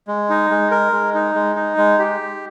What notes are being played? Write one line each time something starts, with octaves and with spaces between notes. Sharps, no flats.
G#3
D#4
G#3
A#4
G#3
D#4
G#3
D#4
G#3
G4